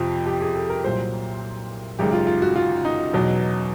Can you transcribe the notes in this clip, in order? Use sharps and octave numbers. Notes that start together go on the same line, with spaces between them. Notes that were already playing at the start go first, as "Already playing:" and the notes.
Already playing: F2 C3 F3
G4
G#4
A4
A#4
C2 A#2 F#3 C5
G#1 F#2 C#3 G4
F4
F4
F#4
F4
D#4
E2 B2 F#3